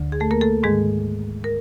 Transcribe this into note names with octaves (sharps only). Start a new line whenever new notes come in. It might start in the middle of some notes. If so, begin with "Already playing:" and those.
Already playing: D2 D3
G#4
A3 A4
A#3 A#4
A3 A4
G#2 D#3 G#3 G#4
A#4